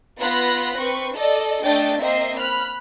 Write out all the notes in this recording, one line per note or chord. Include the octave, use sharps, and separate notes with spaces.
B3 F4 B5 F#6 A#6
C4 B4 C#6
A4 D5 D#5
A3 D4 D#5 G5 A6
A#3 C4 D#5 E5 C7
B5 F6 F#6